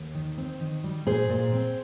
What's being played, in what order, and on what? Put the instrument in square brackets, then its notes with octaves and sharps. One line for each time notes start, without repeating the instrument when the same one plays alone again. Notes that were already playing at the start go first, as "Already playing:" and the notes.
Already playing: [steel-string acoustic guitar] D#2
D#3
C4
D#3
G3
A#2 G#4 C5
A#2
C4